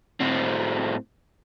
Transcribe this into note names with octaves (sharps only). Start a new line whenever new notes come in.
A2 C4